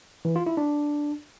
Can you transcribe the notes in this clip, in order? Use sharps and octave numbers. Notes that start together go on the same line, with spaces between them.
E3
F4
E4
D4